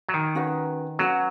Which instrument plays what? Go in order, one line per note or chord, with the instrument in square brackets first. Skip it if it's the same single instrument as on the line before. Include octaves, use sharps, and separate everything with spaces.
[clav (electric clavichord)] F#3
D#3
[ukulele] C#4 F#4 B4 F#5
[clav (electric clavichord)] F#3 [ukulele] C#4 F#4 B4 F#5